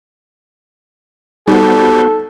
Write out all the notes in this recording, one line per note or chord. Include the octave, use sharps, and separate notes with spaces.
G3 B3 D#4 F#4 A4 C5